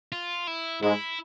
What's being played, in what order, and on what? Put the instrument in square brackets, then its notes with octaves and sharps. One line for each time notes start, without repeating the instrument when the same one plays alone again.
[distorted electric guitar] F4
E4
[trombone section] G#2 G#3 [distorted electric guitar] E4